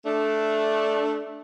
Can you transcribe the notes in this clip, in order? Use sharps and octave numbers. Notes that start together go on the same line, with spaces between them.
A3 D4